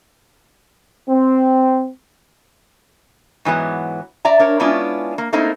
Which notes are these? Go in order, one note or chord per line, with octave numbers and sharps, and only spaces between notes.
C4
G#2 E3 F#3 B3
D5 E5 A#5
D4 A#4 C#5
G#3 B3 C#4 D4 E4 F4
A#3
A3 A#3 C4 D#4 E4